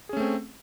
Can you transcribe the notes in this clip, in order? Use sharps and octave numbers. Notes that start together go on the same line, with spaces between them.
A3 C4 C#4 G#4